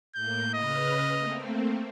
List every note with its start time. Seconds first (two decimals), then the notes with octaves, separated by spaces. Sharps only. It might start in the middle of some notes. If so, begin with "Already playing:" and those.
0.15 A2 A#3 G6
0.54 C#3 B4 D#5 F6
1.17 A3 A#3 C4